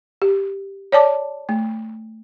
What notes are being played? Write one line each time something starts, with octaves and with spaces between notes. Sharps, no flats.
G4
C#5 D5 A5 D6
A3